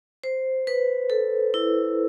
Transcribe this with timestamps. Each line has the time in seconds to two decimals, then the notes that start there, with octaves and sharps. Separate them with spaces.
0.24 C5
0.67 B4
1.10 A4
1.54 E4